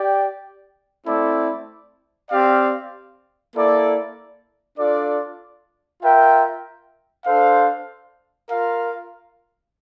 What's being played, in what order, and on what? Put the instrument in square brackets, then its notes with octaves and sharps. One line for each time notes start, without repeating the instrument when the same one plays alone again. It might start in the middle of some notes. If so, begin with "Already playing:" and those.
Already playing: [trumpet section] G4 D5 G5
A3 C4 E4 A4 D5
C4 G4 D5 F5
A#3 E4 A4 D5
D4 F4 A4 D5
F4 A#4 E5 G5
D4 A4 C5 F5
F4 A#4 F5